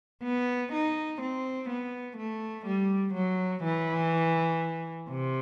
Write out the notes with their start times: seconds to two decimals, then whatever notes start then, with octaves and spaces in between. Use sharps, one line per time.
0.23 B3
0.73 D#4
1.21 C4
1.70 B3
2.17 A3
2.66 G3
3.14 F#3
3.64 E3
5.10 C3